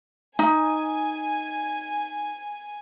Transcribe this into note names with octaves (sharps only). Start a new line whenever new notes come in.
D#4 G#5